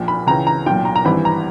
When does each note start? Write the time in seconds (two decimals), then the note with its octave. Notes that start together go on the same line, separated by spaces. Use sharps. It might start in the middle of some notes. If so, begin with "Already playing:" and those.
Already playing: A#1 A#2
0.08 B5
0.27 C#2 C#3 E3 A#5
0.47 A#5
0.66 B1 A#2 G5
0.85 A#5
0.96 A#5
1.05 G#1 G2 E3 B5
1.25 A#5